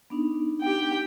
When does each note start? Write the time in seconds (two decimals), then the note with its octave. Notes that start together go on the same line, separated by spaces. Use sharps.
0.10 B3 D4 D#4
0.62 G4 G5